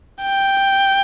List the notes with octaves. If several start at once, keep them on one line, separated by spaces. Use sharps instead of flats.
G5